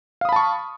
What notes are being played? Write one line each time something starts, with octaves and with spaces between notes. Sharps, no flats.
F5 A5 B5 C#6 D#6